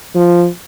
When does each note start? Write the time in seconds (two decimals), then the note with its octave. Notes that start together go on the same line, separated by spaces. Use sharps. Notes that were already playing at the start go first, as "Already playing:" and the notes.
0.16 F3